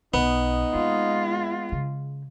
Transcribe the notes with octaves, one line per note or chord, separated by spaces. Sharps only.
B1 B3 D#4
G#3 A#3 F4
C#3